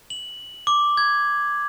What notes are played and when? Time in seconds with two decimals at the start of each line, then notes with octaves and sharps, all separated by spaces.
0.10 F#7
0.67 D6
0.97 G#6